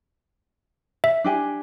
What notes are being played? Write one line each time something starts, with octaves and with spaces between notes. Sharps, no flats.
E5
D4 G4 G#5